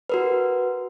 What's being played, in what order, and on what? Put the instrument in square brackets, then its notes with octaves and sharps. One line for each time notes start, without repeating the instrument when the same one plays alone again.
[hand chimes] F#4 A#4 B4